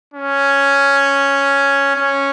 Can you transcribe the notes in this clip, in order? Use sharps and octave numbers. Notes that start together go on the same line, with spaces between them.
C#4
C#4